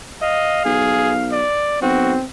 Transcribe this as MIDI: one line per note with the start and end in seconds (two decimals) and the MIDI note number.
0.22 0.64 75
0.22 1.39 77
0.65 1.44 35
0.65 1.14 68
1.32 1.81 74
1.82 2.17 35
1.82 2.24 60
1.82 2.13 66